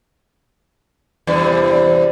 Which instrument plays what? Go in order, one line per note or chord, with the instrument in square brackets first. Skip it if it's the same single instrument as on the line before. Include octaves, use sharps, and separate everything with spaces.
[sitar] E2 G2 C3